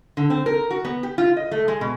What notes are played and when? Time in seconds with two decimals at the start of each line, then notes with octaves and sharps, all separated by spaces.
0.17 D3
0.30 C4
0.46 A#4
0.71 F#4
0.85 B3
1.03 G4
1.18 F4
1.37 D#5
1.51 A3
1.68 G#3
1.81 B2